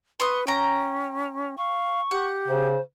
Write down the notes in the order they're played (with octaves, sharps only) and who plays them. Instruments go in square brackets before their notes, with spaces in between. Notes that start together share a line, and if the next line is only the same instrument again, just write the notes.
[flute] B4 [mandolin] C6 C#6 D#6
[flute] C#4 [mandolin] G5 A#5
[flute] F5 [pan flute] C#6
[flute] G4 [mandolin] F#5
[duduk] C#3 [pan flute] C5